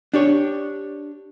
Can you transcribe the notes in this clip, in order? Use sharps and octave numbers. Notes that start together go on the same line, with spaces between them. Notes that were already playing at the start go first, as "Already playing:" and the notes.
D4 G4 C#5